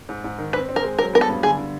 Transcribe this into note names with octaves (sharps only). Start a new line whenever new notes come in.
G#2
G#2
D#3
C4 B4
C4
A#4
G#3
F#3 A#4
B3 A#4
A4
G2
D3 G#4
D3